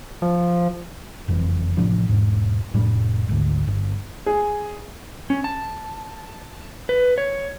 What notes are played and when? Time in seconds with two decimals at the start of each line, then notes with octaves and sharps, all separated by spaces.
0.22 F3
1.28 F#1 F2 E3
1.77 A1 C3 F3 D4
2.09 E1 G#2
2.74 F1 A2 G3 D4
3.29 G#1 D2
3.67 G1
4.26 G#4
5.30 C#4
5.44 A5
6.89 B4
7.18 C#5